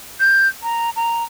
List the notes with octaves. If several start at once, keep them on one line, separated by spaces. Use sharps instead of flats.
G6
A#5
A#5